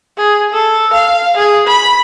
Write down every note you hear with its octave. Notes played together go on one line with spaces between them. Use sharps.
G#4
A4
F5
G#4
B5